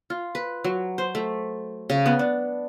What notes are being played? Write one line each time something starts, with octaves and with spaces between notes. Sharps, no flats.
F4
B4
F#3
C5
A3
C#3
B3
D4